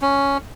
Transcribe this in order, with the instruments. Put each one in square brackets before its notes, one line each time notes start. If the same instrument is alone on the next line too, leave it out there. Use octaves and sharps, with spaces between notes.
[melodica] C#4